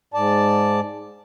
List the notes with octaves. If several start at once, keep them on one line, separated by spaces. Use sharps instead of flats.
G#2 D5 A5